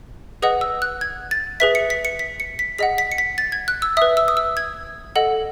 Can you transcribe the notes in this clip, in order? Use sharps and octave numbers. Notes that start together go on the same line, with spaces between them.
G#4 B4 D#5 F#5 D#6
E6
F#6
G#6
A6
G#4 B4 E5 B6
C#7
B6
C#7
B6
C#7
B6
G#4 D#5 F#5 B6
B6
C#7
B6
A6
G#6
F#6
E6
B4 E5 D#6
E6
D#6
E6
G#6
A4 D#5 F#5